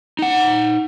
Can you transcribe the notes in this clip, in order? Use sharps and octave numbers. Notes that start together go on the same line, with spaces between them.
D#4 F#5